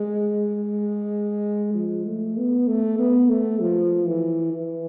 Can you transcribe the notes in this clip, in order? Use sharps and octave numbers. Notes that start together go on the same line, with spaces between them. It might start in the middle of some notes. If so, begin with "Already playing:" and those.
Already playing: G#3
F3
A3
B3
A3
B3
A3
F3
E3
E3